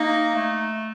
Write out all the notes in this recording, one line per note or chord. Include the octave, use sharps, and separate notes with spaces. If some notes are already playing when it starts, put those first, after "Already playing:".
Already playing: A#3 D#4
A3